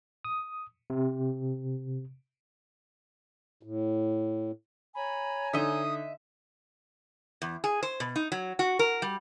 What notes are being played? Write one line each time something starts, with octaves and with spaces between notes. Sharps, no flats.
D#6
C3
A2
C#5 G#5 A#5 B5
D3 D#4 D#5 E5 D#6
E2
G#4
C5
B2
D#4
F#3
F#4
A#4
G3